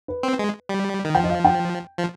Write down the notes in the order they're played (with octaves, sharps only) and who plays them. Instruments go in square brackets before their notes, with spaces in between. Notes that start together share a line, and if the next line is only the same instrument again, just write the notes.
[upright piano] B4
[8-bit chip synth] C4
G#3
G3
D#3
[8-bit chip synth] F3 [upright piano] G5
[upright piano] D#5
F5
G5
[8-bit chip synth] F3